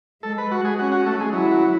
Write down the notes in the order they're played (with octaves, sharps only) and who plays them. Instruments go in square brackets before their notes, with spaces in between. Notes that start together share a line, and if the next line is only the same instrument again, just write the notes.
[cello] G#3 [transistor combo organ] A4
[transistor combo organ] B4
F#4
G#4
[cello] C#4 [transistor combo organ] F#4
[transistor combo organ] F#4
A3
G#3
[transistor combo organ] F#3 [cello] E4
[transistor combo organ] F#3